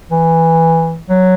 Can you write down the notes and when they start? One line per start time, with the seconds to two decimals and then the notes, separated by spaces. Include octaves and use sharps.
0.11 E3
1.09 F#3